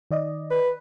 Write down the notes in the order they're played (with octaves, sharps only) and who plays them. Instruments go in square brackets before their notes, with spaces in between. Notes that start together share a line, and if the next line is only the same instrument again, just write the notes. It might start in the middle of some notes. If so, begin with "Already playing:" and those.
[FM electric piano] D#3 D5 D#5
[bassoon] B4